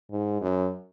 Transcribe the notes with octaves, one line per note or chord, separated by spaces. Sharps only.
G#2
F#2